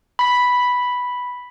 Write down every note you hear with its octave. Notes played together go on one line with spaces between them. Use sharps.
B5 B6